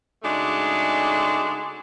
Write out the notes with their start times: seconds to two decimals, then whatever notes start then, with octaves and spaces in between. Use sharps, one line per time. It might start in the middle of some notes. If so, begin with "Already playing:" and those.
0.23 C#3 G#3 A3 D4 D#4 F#4